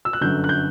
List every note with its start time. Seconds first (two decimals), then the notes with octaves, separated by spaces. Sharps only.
0.05 E6
0.13 F#6
0.21 G1 F#2 D3 F#3 G6
0.44 F#6
0.49 G6